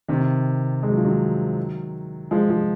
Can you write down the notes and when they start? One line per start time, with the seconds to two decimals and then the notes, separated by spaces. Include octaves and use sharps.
0.08 C3 D#3
0.83 G#3
0.90 F#3
0.96 F3
1.04 D#3 F#3
2.31 F3 G#3
2.50 F3 G#3